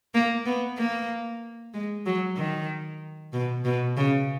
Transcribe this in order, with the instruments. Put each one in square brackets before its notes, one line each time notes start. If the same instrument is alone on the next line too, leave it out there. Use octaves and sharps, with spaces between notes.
[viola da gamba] A#3
B3
A#3
G#3
F#3
D#3
B2
B2
C#3